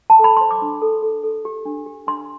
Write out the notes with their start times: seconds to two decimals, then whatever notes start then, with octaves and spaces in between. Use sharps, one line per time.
0.10 A5
0.19 A4
0.24 B5
0.37 C5 C6
0.51 D6
0.62 D4
0.82 A4
1.03 A4
1.23 A4
1.45 G4
1.65 D4
1.86 G4
2.07 D4 C6